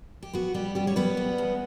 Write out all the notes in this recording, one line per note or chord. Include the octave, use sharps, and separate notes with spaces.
G4
B3 F#4
G3 B3 G4
F#2 G3 G4
C#5
G3 B3 B4
G3
E2